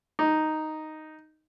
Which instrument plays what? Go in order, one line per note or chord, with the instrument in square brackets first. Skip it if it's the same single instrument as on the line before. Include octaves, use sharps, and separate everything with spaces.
[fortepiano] D#4